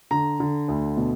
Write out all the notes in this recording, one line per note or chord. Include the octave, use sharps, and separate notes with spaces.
D3 A#5
D3
D2
B2